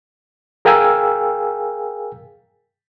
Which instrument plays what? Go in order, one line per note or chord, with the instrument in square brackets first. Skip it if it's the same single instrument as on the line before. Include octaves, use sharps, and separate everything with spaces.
[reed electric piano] G#4 A#4 F5 G5 G#5 E6